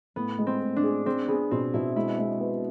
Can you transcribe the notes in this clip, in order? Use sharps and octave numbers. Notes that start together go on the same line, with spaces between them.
A2 B3
G#3
C4
A2
D4
G#4
C4 G#4
B3 G#4
B2 C4
B2 E4
G#3 E4
G#3
B3